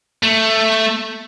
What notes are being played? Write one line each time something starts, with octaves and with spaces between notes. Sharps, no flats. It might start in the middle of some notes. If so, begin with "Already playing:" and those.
A3